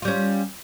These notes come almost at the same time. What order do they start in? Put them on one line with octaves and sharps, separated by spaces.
F4 G3 C#4